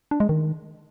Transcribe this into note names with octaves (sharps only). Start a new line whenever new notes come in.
D4
G#3
D#3